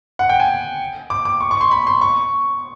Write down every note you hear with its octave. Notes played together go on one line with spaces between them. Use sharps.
F#5
G5
G#5
D6
D6
C#6
C#6
C6
B5
C6
C#6